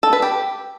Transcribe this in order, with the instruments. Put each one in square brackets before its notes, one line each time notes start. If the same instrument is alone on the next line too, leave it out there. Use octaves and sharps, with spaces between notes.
[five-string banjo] A4
B4
G4